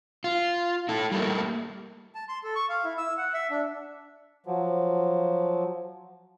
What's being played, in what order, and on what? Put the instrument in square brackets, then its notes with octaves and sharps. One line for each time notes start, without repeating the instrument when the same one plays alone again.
[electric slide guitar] F4
E4 A4
G3 A3 A#3
[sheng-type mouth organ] A5
C6
A4
C#6
F5
E4
E6
F#5
E5
D4
[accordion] F3 F#3